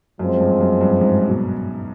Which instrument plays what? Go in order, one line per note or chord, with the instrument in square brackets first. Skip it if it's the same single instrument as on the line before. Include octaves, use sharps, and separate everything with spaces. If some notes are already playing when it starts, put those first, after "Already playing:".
[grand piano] F#2 [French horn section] F3 G#3 C4
[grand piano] G2
F#2
G2
G#2
B2